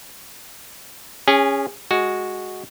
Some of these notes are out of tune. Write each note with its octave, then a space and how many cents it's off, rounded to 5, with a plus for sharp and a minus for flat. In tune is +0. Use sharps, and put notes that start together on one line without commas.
C#4 +0 G#4 -30
G#3 +0 F#4 +0